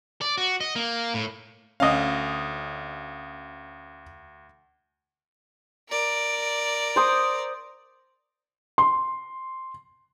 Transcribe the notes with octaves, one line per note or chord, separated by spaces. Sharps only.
D5
F#4
D#5
A#3
A2
D2 C#4 D#5 F5
A#4 D5
C5 D#6
C6